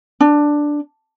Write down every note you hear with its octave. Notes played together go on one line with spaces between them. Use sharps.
D4